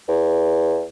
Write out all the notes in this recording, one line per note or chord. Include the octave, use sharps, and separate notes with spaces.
E2